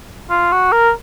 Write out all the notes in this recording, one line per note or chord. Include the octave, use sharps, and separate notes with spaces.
F4
F#4
A#4